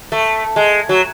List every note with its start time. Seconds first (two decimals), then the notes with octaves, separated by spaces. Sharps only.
0.12 A3
0.56 G#3
0.89 F#3